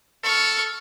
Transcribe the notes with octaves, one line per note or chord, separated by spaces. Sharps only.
A4 C#6 F6